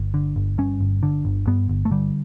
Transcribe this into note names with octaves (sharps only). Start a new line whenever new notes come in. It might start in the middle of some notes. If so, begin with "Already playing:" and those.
Already playing: G1
D3
G1
G2 C#4
G1
D3
G1
G2 B3
G1
A3
D3 G3